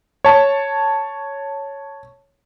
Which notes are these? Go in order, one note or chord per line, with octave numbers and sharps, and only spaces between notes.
C#5 A5